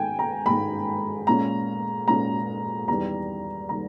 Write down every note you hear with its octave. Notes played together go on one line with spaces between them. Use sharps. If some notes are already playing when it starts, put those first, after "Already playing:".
Already playing: G#2 D#3 G#3 G5 G#5
A#5
G#2 D#3 G#3 B5
A#2 G#3 C#4 A#5
A#2 G#3 C#4 A#5
E2 D#3 G3 A#5
D#3 G3 A#5